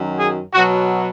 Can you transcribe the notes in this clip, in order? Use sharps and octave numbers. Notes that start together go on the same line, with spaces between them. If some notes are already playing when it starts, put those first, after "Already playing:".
Already playing: F#2 D#3 F#3
G#4
B2 F#3 F#4